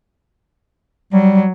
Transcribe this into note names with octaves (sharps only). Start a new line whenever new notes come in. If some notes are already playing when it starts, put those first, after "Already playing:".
F#3 G3